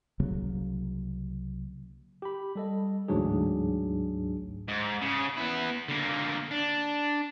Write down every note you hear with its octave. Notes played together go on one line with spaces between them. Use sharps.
C2 C#3 F#3 A#3
G4 B5
G3 A4 D#5
A1 D2 G#2 F#3 D4 G#4
G#2
C#3 G#4
B3 E4
D3 A#3
D4